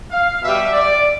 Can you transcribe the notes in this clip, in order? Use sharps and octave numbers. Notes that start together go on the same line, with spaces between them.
F5
B2 G3 E5
D5